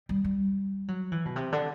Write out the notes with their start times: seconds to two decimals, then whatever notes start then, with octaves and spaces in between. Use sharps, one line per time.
0.09 G3
0.24 G3
0.88 F#3
1.12 E3
1.25 B2
1.36 C3
1.52 D3